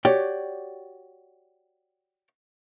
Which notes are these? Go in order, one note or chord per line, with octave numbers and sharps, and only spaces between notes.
F#4 G4 C#5 D5 G5